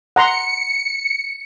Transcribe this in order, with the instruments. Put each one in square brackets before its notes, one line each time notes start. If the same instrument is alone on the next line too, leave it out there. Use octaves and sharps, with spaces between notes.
[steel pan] F#5 A#5 C6 [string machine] C#7